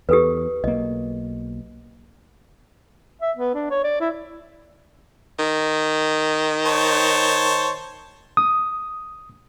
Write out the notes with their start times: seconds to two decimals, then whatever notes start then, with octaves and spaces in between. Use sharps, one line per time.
0.09 E2 G4 A4 B4
0.64 B1 A#3 D#5
3.22 E5
3.37 B3
3.54 D4
3.70 C#5
3.84 D5
4.00 E4
5.39 D#3
6.65 C5 C#5 A5
8.37 D#6